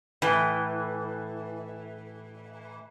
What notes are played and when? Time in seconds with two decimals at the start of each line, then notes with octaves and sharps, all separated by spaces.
0.22 A2 E3